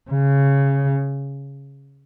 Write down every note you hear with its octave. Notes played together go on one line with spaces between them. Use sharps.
C#3